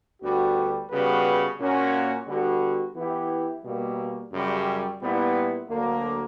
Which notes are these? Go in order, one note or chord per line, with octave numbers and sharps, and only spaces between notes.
D2 D3 G3 B3 F#4
C#3 G3 B3 F#4 B4
A#2 A#3 C#4 F#4
D3 G3 B3 D4 F#4
E3 B3 E4 G4
B2 G3 A#3
F#2 C#3 G3
A#2 G3 B3 E4
D2 D3 F#3 A#3